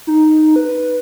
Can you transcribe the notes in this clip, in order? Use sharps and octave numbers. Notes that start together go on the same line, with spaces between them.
D#4
B4